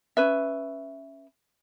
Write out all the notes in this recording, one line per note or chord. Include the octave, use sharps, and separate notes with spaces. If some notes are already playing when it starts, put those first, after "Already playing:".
C#4 B4 E5